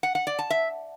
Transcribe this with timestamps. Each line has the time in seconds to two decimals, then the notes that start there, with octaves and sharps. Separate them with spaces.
0.03 F#5
0.15 F#5
0.27 D5
0.39 A5
0.50 E5